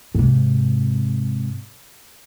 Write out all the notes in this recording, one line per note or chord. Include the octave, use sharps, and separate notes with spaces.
G#2 C3